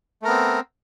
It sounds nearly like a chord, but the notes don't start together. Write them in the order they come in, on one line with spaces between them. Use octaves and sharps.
A3 A#4 B3 C4